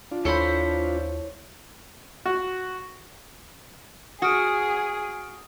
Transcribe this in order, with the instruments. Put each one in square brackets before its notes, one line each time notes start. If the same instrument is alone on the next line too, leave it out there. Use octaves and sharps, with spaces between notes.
[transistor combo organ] D4 F4
[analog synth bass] D#2 [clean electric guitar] E4 C#5 [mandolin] A4 C5 B5
[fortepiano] F#4
[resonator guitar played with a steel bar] F#4 [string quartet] G#4 [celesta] D#6 F6 D7